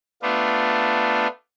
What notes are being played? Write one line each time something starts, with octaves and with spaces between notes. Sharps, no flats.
A3 B3 D4 F4